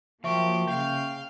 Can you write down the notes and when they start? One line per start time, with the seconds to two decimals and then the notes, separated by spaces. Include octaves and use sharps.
0.24 F3 F#3 A#3 G4 E5 C#6
0.67 C#3 F5 G5